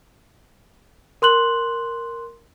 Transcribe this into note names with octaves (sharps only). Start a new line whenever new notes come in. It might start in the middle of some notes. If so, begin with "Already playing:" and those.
A#4 C6 F#6 F#7